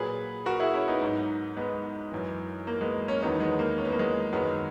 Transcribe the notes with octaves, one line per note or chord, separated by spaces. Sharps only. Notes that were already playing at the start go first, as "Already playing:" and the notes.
Already playing: A#2 F#3 G#4 B4
F#4 A#4
E4 G#4
C#4 E4
B3 D#4
G#2 F#3
G#3 B3
F#2 E3
A#3
G#3 B3
A#3 C#4
E2 D#3 F#3 B3 D#4
G#3 B3
A#3
C#4
B3
A#3
G#3 B3
F#2 D#3 F#3 G#3 B3